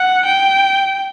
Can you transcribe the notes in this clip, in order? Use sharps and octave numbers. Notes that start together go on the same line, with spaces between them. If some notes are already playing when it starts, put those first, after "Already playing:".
Already playing: F#5
G5